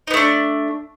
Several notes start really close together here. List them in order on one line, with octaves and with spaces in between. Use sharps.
D#4 B3 A3 D4